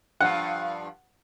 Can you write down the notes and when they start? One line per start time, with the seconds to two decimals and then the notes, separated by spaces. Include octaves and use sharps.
0.21 G2 F3 F#5